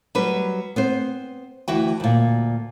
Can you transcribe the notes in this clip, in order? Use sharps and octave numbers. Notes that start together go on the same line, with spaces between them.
F#3 G3 B4
B3 C4 C5
D2 E3 F#4 G5
D2 A#2